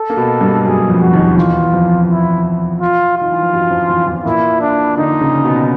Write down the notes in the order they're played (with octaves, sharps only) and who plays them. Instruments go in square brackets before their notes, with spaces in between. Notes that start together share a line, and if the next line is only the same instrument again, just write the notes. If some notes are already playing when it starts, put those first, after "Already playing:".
Already playing: [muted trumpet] A4
[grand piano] A#3
B2 B3
G2 G3
[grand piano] F#2 F#3 [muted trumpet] G#4
[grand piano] F2 F3
[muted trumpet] F#4
[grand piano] D#2 D#3
[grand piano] E2 E3 [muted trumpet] F4
[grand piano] F2 F3
[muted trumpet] E4
F4
[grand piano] D#3 [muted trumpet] F4
[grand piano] E3
F3
F#2 F#3
F2 F3
E2 E3
E2 E3
[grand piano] A#2 A#3 [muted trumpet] E4
[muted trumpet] D4
[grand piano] D3 D4 [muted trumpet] D#4
[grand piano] C#3 C#4
B2 B3